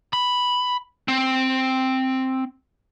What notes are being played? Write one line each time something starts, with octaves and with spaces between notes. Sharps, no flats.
B5
C4